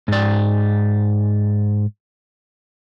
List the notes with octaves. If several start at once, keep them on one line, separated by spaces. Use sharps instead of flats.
G#2 D5